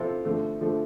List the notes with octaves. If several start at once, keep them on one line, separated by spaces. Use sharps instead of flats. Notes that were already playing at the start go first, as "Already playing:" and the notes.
Already playing: C3 F3 C4 F4 A4
D3 F3 A3
D3 F3 A3